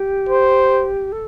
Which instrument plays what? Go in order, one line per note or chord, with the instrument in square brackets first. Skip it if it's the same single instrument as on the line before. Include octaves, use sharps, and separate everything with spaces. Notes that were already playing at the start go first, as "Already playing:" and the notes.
Already playing: [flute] G4
[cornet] C5
[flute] A4